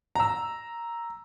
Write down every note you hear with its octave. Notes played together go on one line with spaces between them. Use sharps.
A#5 E6